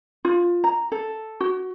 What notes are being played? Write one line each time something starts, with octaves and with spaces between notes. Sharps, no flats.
F4
A#5
A4
F#4